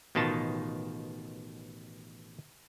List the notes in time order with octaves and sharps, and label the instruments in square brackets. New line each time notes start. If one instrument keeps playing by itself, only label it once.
[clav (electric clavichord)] A1 B2 D#3 F4 A5